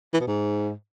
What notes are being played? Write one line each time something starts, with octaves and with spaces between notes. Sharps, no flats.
E3
B2
G#2